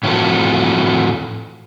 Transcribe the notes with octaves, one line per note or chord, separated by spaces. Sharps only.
A2 E3 F3 C4 F#4 A4